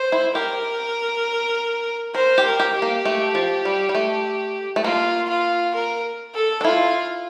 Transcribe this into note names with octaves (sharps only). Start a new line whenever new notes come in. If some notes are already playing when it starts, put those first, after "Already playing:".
Already playing: C5
E4
G4 A#4
A#4 C5
G4
A#4
G4
G4
A#3
A3
F3
G3
G3
A3
A3
A#3 F4
F4
A#4
A4
D4
E4 F4